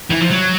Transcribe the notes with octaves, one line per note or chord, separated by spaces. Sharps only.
E3
F3
F#3